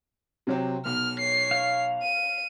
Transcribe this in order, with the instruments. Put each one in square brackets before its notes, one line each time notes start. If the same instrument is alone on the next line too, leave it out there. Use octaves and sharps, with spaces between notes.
[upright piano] C3 F#3 C4
[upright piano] B1 [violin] F6
[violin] C#5 C7
[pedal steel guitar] F5
[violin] D#7